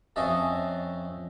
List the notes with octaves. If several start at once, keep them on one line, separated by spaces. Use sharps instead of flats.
F2 C#4 D#5 E5 A5